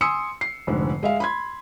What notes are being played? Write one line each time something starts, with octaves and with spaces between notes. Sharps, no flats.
G#5 C6 D#6 E6 C#7
C7
F1 G#2 D3
G#3 E5 F5
B5 C6 G#6